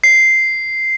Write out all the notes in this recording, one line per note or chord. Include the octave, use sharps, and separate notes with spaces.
C7